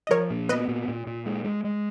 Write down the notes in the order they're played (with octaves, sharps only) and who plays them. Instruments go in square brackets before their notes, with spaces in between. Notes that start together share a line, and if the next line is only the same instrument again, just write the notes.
[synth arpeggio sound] D#5
[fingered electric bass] F3 [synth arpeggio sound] A#4 C#5
[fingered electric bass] A#2
[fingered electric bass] B3 [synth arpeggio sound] B4 D#5
[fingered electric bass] A#2
A#2
A#2
G#3
G#3
G#3